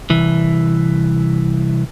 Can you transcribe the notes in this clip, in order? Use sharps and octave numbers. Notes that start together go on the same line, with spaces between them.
C2 E3